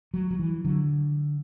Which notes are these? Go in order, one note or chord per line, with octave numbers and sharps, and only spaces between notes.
F#3
F#3
E3
D3 F#3